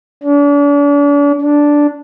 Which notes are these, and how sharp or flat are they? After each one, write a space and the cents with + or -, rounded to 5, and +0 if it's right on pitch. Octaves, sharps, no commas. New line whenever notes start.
D4 -40
D4 -5